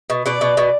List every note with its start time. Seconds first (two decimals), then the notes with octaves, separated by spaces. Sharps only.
0.10 B2
0.26 B2 D5
0.41 B2
0.57 B2